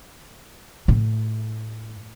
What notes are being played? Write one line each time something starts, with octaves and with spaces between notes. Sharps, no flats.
A2